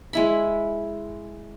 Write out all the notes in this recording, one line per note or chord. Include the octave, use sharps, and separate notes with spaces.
G#3 E4 B5